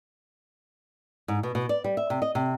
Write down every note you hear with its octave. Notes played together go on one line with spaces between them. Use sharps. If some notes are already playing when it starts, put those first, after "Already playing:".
G#2
B2
B2
D5
G3
E5
C3
D#5
C3